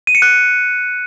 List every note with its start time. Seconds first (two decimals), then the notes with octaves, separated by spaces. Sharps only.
0.07 D#7
0.15 C#7
0.22 F#6